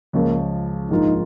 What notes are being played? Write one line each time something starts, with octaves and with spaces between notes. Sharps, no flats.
C#2 C#3 F3 A#3
A#1 G#2 F3 A#3 D#4 F4